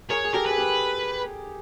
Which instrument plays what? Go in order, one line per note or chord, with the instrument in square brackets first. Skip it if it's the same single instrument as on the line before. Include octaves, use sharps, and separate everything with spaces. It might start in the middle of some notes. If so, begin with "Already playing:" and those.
[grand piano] G#4 A#4 [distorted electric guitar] C#5
[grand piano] G#4
[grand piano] G4 A4 [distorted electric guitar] A#4
[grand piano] G#4 [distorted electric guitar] B4
[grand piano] G4 A4